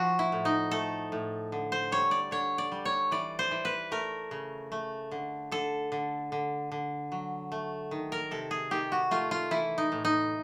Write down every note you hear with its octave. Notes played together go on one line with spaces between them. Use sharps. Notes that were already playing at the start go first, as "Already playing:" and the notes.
Already playing: F3 F#4
E4
A2
D#4
A3 A4
A2
D3
C5
G3 C#5
D5
D3 C#5
D5
G3
C#5
E3 D5
C5
E3
B4
A3 A#4
C#3
A3
D3
D3 A4
D3
D3
D3
F#3
A3
D#3
A#4
C3 A4
G#4
D#3 G4
F#4
A3 F4
F4
E3 E4
D#4
A2
D#4